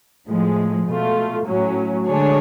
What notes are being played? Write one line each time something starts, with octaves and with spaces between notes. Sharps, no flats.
A2 F3 G#3
B2 A3 F4
A2 F#3 C#4
D3 G#3 D4 G#4 C#5